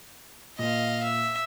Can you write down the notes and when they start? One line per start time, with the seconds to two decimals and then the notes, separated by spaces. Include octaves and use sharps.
0.59 A#2 D#5 F5
1.04 E5